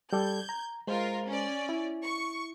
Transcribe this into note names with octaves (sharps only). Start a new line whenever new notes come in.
G3 A4 D5 G6 G#6
A#5
G#3 F4 A#4 C5
C#4 D5
E4
C#6